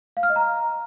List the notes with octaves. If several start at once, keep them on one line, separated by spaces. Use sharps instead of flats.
F5
F6
D#5
A#5